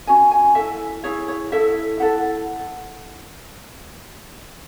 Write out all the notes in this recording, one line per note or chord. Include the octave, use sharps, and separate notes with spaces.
C#4 F#4 G#5
G#5
E4 A4 E5
E4 G#4 C#5
C#5
E4 A4 E5
E4 A4 F#5